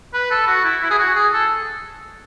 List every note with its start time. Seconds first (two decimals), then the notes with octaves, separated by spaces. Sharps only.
0.14 B4
0.31 A4
0.47 F#4
0.64 E4
0.82 E4
0.91 G#4
0.99 F#4
1.15 G#4
1.33 A4